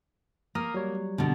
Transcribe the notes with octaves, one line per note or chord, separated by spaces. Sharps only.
A#3 A#5 D#6 F6
F#3 G3 C#5
B2 D3